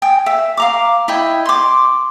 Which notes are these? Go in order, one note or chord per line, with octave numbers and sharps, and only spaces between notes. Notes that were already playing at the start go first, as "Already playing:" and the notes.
G5 G#5 D#6
E5
F5 A#5 D6
E4 D#5 G5
C6 D6